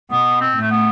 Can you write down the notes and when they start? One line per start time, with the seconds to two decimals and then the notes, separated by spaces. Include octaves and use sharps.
0.10 B2 B3
0.41 C4
0.56 A2
0.62 A3
0.70 B3